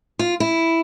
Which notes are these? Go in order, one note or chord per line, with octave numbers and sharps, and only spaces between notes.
F4
E4